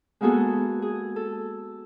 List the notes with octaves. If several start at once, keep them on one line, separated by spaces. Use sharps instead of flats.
G#3 A#3 B3 F#4 G#4 A4
G#4
A4